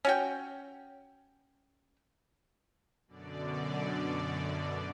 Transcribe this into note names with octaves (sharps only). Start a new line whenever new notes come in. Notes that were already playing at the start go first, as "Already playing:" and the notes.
C#4 F#4 G5
F#2 B2 D3 D5